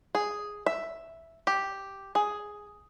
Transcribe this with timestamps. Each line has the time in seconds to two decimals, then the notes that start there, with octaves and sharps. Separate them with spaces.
0.15 G#4
0.66 E5
1.47 G4
2.15 G#4